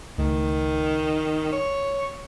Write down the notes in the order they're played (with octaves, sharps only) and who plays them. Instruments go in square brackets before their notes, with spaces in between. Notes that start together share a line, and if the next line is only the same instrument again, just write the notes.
[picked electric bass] C#2 A3 [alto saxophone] D#3
[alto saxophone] C#5